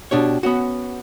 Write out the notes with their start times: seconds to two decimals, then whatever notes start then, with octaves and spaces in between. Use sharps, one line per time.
0.11 B2 D4 G4 C#5
0.43 B3 C#4 F#4